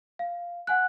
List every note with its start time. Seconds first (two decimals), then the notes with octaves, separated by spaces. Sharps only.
0.19 F5
0.67 F#5 G#5 F#6